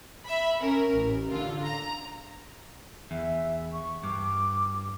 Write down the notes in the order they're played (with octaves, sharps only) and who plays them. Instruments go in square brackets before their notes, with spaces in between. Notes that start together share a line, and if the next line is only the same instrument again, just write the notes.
[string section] E5 B5
C#4 A#4
A1
D3 F4
A#5
[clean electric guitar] E2 [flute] E5
[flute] C#6
[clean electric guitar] G2 [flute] D6